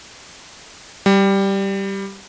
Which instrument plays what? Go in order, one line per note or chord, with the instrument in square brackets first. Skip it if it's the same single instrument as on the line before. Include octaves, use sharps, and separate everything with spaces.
[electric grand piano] G3